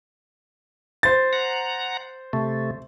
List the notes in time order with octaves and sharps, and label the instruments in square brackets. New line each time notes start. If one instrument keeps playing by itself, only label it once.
[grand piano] C5 A6
[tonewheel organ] F#5 A#5
C3 A3